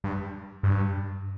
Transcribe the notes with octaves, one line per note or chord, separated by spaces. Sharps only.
G2
G2